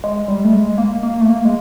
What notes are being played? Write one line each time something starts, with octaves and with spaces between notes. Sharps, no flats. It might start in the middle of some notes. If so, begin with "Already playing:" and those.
G#3
G3
A3
G#3
A#3
A#3
A3
A#3
G#3